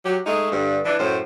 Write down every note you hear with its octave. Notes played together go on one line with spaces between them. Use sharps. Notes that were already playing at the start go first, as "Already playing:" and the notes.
F#3 G4
G#3 A3 D#4 G#4
G2 D3
E3 D4
F#2 A2 C#4 C5